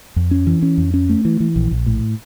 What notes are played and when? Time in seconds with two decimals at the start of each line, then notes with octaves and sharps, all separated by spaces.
0.16 F2
0.31 C#4
0.47 E3
0.62 C#4
0.78 F2
0.94 C#4
1.10 A3
1.25 E3
1.40 E3
1.56 A#1
1.71 A#1
1.86 A2